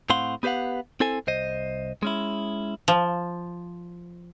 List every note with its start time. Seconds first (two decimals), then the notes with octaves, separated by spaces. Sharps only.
0.10 A2 C4 F5 F#5 C6
0.43 B3 G4 B4 C5 F5 F#5
1.00 C4 E4 A4 C5 G#5
1.27 C2 C5 D#5
2.03 G#3 C#4 E4
2.88 F3